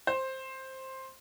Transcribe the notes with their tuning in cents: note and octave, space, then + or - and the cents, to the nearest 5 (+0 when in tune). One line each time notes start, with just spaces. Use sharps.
C5 +10